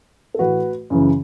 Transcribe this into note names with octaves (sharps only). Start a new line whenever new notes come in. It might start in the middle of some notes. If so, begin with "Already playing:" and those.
A4
A2 E3 A3 F#4 B4
F#2 C#3 E3